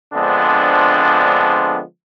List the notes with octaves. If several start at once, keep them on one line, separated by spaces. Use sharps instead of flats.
D3 F3 G#3 B3 C4 D4